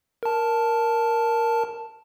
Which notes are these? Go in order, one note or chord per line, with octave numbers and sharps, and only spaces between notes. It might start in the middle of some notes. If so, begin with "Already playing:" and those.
A#4 A5